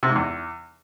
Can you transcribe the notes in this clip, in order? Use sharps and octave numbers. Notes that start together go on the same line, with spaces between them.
C3
G#2
E2